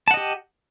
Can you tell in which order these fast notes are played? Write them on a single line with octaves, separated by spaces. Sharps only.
A5 F#5 D#5 G4